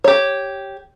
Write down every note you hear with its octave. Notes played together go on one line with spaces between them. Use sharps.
G4 C#5